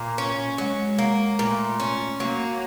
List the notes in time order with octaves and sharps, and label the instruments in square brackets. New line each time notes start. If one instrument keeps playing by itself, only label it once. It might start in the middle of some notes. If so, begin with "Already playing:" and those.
Already playing: [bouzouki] A#2 [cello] A#3
[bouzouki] C#4
[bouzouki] F#3 [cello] G#3
[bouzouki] A#3
[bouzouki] A#2 [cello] A3
[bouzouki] C#4
[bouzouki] F#3 [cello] A#3